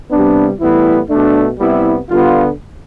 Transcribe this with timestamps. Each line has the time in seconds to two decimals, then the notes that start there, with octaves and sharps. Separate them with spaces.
0.11 C3 G3 B3 D4
0.60 A2 E3 G3 B3 E4
1.10 B2 A3 D4
1.59 C3 G3 B3 E4
2.09 D3 G3 B3 F4